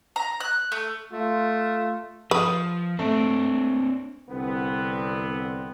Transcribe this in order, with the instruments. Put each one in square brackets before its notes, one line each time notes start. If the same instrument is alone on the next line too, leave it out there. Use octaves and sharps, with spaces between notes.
[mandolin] A#5
F#6
A3
[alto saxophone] A3 [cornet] F4
[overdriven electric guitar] F3 [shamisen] B4 [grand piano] D#6
[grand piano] A3 [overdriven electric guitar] C4 D4
[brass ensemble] C2 D3 B3 C4